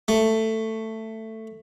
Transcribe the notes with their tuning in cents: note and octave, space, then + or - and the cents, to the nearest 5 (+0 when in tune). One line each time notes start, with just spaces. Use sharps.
A3 +10